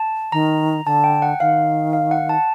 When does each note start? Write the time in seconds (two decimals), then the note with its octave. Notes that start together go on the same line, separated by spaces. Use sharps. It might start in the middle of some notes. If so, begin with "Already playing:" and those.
Already playing: A5
0.32 D#3 A#5
0.85 D3 A5
1.04 G5
1.22 F#5
1.40 D#3 F5
1.93 F5
2.11 F#5
2.29 A5